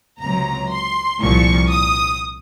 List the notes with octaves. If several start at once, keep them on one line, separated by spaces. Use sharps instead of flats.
C#2 C3 F#3 A#5
C6
C2 A#2 F3 C#6
D#6